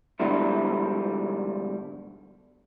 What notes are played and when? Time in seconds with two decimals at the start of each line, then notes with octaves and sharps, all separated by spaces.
0.19 G#2 B2 D3 F3 G3 E4